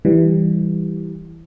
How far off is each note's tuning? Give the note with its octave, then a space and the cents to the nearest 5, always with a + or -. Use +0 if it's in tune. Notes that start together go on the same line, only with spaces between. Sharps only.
E3 -5 G3 +0